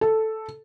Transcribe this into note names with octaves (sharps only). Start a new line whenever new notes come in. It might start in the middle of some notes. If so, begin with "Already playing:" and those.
A4